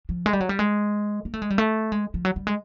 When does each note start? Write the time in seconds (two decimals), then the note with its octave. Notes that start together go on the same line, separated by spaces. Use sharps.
0.09 F3
0.26 G#3
0.33 G3
0.40 F#3
0.49 G3
0.59 G#3
1.25 A#3
1.34 A3
1.42 G#3
1.50 G3
1.58 A3
1.92 G#3
2.14 F3
2.25 F#3
2.36 G3
2.47 G#3